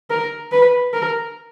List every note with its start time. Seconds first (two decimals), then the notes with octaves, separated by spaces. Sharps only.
0.10 A#4
0.52 B4
0.93 A#4